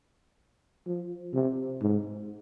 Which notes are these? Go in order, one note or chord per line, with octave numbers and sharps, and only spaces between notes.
F3
C3
G#2